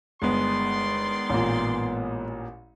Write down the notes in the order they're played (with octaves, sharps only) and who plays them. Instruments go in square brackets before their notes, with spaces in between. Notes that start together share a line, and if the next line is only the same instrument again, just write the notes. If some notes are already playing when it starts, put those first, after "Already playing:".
[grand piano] G1 [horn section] D#3 D5 C6 [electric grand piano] G#3 B3
[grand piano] A1 A#2